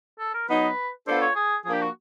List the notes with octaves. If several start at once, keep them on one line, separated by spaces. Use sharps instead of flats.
A4
A#4
F#3 B3 D#4 B4
B3 D4 F4 A4 C5
C#5
G#4
F3 A#3 D4 G#4
G4
F#4